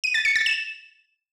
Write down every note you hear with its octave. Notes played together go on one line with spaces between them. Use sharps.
D#7
A6
C#7
A6
E7